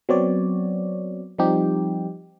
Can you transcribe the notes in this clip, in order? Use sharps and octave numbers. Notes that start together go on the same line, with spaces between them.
F#3 B3 C4 F#4 C#5 D5
F3 G3 C4 D#4 G4